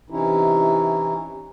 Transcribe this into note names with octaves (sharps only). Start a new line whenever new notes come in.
C3 E3 C#4 D#4 E4